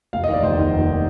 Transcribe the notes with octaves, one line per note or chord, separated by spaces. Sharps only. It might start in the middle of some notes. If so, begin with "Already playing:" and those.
F1 F5
D#5
D#2 D#3 D5
F1 C5
D#2 D#3
F1
D#3